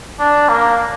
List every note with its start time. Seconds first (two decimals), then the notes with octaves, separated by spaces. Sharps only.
0.20 D4
0.49 A#3